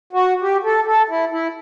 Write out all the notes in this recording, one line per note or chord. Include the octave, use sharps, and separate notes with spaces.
F#4
G4
A4
A4
E4
E4